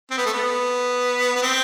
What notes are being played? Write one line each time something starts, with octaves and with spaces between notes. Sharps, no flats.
C4
B3
A3
B3
B3
C4